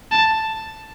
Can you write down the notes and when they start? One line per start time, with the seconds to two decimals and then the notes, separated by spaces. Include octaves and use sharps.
0.12 A5